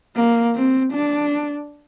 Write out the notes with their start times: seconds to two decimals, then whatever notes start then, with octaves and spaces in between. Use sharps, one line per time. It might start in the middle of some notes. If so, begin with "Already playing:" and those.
0.16 A#3
0.55 C4
0.93 D4